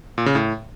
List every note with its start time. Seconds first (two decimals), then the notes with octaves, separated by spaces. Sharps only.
0.18 A#2
0.26 C#3
0.35 A2